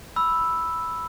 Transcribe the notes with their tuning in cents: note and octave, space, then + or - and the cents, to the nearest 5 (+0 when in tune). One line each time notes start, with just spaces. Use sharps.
B5 +0 E6 +0